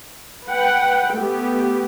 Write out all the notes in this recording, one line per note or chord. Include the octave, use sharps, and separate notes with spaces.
B4 F#5 G5
A3 B3 G4